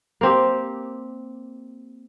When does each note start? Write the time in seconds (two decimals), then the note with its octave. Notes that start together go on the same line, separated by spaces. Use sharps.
0.21 A#3 C4 G4